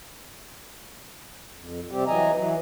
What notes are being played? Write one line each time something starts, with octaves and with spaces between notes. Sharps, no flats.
F2
C3 G3 C4 G4
E3 F#3 D#5 G#5 A#5
E3 F#3